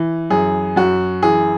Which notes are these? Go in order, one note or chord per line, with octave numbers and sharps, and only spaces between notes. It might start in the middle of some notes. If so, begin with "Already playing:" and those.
Already playing: E3
F#2 G#4
F#2 F#4
E3 G#4